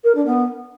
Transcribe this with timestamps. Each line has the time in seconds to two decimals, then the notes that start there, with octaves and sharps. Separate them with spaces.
0.04 A#4
0.15 D4
0.26 B3